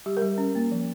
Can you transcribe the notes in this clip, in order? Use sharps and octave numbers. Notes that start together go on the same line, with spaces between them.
G3 G4
A#4
G3
C#4
A#3
F3